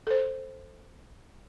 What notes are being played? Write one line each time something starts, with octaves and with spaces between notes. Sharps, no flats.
A4 C5